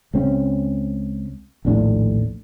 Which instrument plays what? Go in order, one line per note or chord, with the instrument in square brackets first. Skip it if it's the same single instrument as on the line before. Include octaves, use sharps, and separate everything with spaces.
[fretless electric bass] C#2 C#3 C4 C#4
A#1 D#2 A2 D4